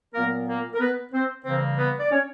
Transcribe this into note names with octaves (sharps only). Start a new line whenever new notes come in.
A#2 F#3 A#3 B3 A#4
A#3 A#4
A#4
B3 B4
C4 C5
C#3 E3 G3 A#3 C4 C5
B3 B4
D5
C#4 C#5